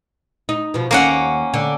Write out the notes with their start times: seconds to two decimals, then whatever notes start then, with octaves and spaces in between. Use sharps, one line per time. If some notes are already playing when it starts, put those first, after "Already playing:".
0.49 D#4
0.74 B2 F3
0.91 D#2 A#3 C#4 F#5
1.54 D3